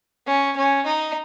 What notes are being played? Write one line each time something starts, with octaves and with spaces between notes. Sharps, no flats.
C#4
C#4
D#4